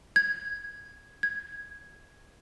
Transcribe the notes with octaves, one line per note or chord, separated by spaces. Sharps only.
G#6
G#6